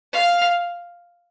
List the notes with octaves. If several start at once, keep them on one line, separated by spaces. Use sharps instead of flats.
F5